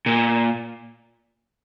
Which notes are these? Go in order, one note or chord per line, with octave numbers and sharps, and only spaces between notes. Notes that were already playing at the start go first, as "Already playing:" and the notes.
A#2